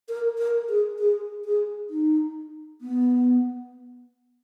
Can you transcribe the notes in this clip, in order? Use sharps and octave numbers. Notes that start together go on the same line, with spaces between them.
A#4
A#4
G#4
G#4
G#4
D#4
B3